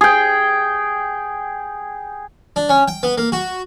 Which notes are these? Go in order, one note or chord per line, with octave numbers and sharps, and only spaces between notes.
G#4 G5
D4
C#4
G5
B3
A#3
F#4